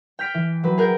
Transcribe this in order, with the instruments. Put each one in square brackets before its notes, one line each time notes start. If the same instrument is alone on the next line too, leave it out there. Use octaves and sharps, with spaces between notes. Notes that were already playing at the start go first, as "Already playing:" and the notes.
[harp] G5 F6 B6 D7
E3
F#3 B4
G#4 A#4 F#5 G5